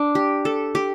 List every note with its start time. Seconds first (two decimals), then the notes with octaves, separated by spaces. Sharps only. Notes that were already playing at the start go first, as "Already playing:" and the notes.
Already playing: D4
0.15 G4
0.45 A4
0.75 G4